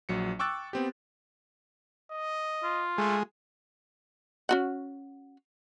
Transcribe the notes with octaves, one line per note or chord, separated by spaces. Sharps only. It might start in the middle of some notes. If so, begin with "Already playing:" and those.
A#1 F#3 C#7
G5 C#6 D6 E6 F#6 A6
B3 C4 G4
D#5
F4
G#3 A3
C#4 F#4 F#5